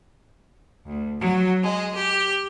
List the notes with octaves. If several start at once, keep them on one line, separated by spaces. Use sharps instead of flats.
D2
F#3
G#3
G4